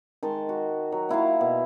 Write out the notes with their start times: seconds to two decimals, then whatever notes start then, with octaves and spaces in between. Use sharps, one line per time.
0.23 D#3 G#3 A5 C6
0.49 F#4
0.92 F#3
1.09 A#3 E4 F4 F5
1.41 B2